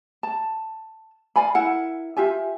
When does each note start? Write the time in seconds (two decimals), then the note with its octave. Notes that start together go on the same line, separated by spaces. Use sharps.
0.23 A5
1.36 D5 F5 G#5 B5
1.55 E4 A#4 F#5
2.17 F4 G4 E5 G#5